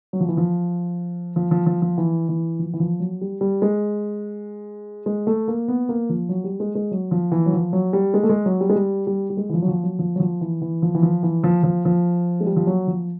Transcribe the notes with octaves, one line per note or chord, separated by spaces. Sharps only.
F#3
F3
E3
F3
F3
F3
F3
F3
E3
E3
F3
E3
F3
F#3
G3
G3
G#3
G#3
A3
A#3
B3
A#3
F3
F#3
G3
G#3
G#3
F#3
F3
E3
F#3
F3
F#3
G3
G#3
A3
G#3
F#3
G3
G#3
G3
G3
G3
G#3
E3
F3
F#3
F3
F#3
F3
F#3
F3
E3
E3
F3
E3
F3
E3
F3
F3
F3
G#3
G3
F3
F#3
F3